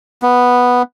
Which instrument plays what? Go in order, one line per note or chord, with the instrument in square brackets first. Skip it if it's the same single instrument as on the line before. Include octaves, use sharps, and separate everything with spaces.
[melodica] B3